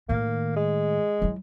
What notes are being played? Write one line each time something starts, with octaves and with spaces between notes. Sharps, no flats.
A2 D#3 A#3
G#3
F#3 E4